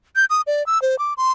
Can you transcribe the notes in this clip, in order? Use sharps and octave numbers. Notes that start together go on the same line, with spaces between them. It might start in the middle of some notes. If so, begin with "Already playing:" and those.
G6
D#6
D5
E6
C5
D6
C6